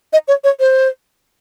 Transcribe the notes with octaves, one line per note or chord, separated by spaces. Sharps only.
D#5
C#5
C#5
C5